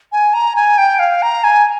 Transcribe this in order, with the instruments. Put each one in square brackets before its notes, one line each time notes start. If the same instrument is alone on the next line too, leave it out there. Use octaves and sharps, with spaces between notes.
[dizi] G#5
A#5
G#5
G5
F5
A#5
G#5